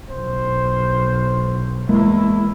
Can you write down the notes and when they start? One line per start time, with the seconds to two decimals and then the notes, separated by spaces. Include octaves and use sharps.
0.10 B1 C5
1.89 E2 E3 G#3 A#3 E4